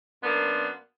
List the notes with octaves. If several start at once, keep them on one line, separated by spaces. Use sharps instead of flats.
F#2 A#3 B3 D4 C6